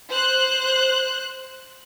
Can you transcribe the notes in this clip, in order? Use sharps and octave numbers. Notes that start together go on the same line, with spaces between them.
C5 F#6